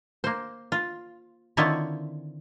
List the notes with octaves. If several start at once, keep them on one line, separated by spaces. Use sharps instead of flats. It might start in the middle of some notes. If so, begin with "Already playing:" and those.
A#3 C5
F4
D3 D#3 C4 E4 F4 C#5